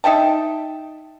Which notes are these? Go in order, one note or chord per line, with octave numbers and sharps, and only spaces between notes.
D#4 E5 G5 A5